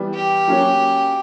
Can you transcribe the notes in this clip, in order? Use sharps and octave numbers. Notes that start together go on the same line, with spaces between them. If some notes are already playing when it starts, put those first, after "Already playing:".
Already playing: E3 G3 B3
G4
F#3 A#3 C#4 F#4